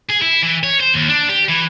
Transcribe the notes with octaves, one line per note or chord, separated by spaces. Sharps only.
G#4
E4
E3
C#5
C5
D#2
D4
G4
E3